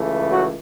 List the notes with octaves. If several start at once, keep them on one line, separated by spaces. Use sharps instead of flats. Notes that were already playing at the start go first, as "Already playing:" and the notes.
Already playing: C#2 C#3 E3 A3
F#3 F#4